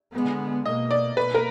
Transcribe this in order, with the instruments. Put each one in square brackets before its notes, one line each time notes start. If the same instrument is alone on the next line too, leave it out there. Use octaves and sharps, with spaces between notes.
[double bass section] D3 G#3 B3
[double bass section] B2 A#3 [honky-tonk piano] D#5
[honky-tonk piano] D5
[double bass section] B2 A#3 [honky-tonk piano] B4
[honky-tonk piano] A#4